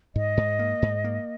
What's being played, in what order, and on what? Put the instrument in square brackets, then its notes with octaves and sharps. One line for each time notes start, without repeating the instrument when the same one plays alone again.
[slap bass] G#2 [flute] D#5
[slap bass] G#2
A#3
G#2
A#3